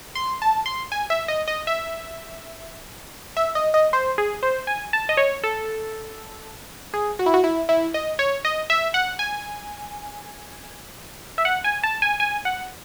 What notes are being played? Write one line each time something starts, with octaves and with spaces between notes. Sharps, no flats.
C6
A5
C6
G#5
E5
D#5
D#5
E5
E5
D#5
D#5
C5
G#4
C5
G#5
A5
D#5
C#5
A4
G#4
F#4
E4
F#4
E4
E4
D#5
C#5
D#5
E5
F#5
G#5
E5
F#5
G#5
A5
G#5
G#5
F#5